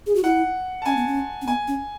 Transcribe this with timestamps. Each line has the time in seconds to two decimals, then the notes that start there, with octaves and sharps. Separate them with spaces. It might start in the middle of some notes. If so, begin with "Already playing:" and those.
0.07 G#4
0.15 F#4
0.24 E4 F#5
0.82 A5
0.86 C#4 G#5
0.97 B3
1.07 C#4
1.42 C#4
1.47 B3 G#5
1.68 C#4